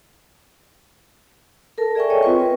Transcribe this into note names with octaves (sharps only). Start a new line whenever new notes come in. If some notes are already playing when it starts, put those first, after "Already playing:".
A4 A#4 A5
G#4 D5 E5 G5 G#5 C#6
C#5 D#5 G5
C4 F4 B4 C#6
A#4 B4